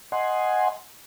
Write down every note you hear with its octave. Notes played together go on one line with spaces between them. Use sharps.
D#5 F#5 G#5 C6